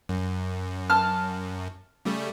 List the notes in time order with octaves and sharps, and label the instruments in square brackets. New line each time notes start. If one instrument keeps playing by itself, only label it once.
[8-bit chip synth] F#2
[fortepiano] A5 F6
[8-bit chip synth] C#3 G3 A3